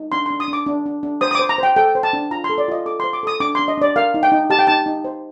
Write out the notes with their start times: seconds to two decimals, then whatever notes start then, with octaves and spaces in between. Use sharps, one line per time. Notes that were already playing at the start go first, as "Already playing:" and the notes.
Already playing: D#4
0.12 D4 C6
0.26 D4 C6
0.40 D#6
0.48 D4
0.53 D6
0.66 D4
0.86 D4
1.03 D4
1.21 C5 D#6
1.31 D#6
1.35 C5 D6
1.49 A#5
1.58 C5 G5
1.76 A4 G5
1.95 C5
2.03 A5
2.13 D4
2.31 F4 A#5
2.44 C6
2.50 A4
2.58 D5
2.68 F4 D#5
2.86 A4 D6
3.00 C5 C6
3.13 D6
3.23 A4 D#6
3.40 D4 D6
3.55 D4 C6
3.68 D#5
3.78 D4 D5
3.96 A#4 F5
4.14 D#4
4.23 G5
4.32 D#4
4.50 G4 A5
4.59 G5
4.67 D#4 A5
4.86 D#4
5.04 C5